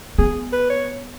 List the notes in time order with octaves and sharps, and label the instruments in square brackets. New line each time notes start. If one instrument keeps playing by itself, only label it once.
[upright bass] B3 [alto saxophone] G#4
[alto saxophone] B4
C#5